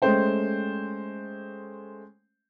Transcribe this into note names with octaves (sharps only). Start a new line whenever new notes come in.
G#3 A3 C#4 C5 G5